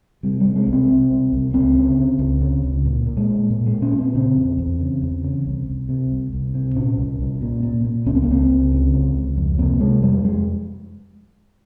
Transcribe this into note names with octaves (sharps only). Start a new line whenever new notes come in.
C3 G3
C3 G3
G#3
C2
C4
C3
C2
C2
C#2 C4
C#3
C#3
C#2
C#3
C#2
A#2
A#2
G#3
A#2
A#2
G#3
A#2
C#4
A#2
C4
C#3 C4
E2
E2
C#3
E2
C#3
C2
C2
C3
C2
C2
C3
A#2 C#4
C2
C2
A#2
A#2
A#2
C#2 C#4
C4
A#3
C#2 C4
C#2
C#3
C#2
C#2
F2
C3 A#3
C3 G#3
F2 G3
F2 G#3